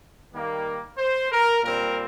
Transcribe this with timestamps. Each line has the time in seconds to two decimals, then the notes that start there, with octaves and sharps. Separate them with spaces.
0.33 D#3 G3 A#3
0.98 C5
1.32 A#4
1.64 A#2 G3 C4 A#4